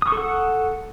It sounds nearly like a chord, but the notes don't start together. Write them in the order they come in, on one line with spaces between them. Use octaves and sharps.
D#6 C#6 A4 F#5